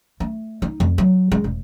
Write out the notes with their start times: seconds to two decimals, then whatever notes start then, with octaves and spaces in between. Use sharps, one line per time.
0.20 A3
0.62 D#4
0.80 F2
0.98 F#3
1.32 G#3
1.44 E1